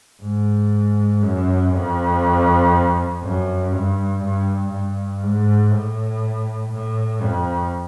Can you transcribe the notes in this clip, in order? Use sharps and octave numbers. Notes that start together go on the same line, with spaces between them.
G#2
F#2
F2
F#2
G2
G2
G2
G#2
A2
A2
F2